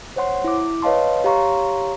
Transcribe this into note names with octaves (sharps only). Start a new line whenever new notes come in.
C5 C#5 F#5 C6
E4 D6
B4 C#5 D#5 F5 A5 C6
G4 C#5 F5 A#5 C6 C#6